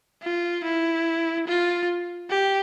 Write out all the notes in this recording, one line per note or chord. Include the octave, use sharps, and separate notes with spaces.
F4
E4
F4
G4